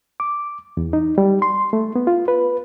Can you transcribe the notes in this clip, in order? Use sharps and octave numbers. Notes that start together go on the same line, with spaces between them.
D6
E2
D#4
G3
C6
A3
B3
F4
B4